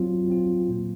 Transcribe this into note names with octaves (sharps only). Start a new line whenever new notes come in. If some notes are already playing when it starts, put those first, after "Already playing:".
Already playing: F#3 C4 F4
F#3 C4 F4
A#2 F#3 A#3